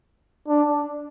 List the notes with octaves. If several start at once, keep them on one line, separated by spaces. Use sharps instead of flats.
D4